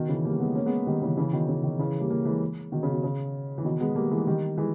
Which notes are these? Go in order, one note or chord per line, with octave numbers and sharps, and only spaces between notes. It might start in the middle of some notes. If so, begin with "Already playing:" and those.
Already playing: B2 D#3
C#3 E3
G3 A#3
G#3 B3
A#3 C#4
G#3 B3
D#3 G3
C#3 E3
C#3 E3
B2 D#3
C#3
B2 D#3
C#3 E3
G3 A#3
G3 A#3
E3 G#3
B2 D#3
C#3
B2
C#3
E3
B2 D#3
G#3 B3
G3 A#3
E3 G#3
D#3 G3
E3 G#3